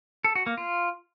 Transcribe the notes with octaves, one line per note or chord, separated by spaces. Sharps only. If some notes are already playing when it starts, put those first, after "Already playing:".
A4
F#4
A#3
F4